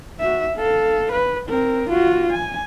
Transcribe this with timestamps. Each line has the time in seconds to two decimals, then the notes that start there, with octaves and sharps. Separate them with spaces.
0.20 F#4 E5
0.55 A4 F5
1.12 B4
1.49 C4 A#4
1.89 F4 F#4
2.32 G#5